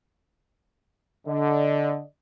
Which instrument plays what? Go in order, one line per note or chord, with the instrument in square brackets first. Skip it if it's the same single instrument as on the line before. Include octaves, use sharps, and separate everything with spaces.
[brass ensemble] D3 [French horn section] D5 D#5